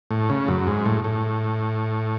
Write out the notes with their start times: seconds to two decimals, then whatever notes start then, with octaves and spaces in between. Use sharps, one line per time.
0.11 A2
0.29 C#3
0.48 F#2
0.67 G#2
0.85 A2
1.04 A2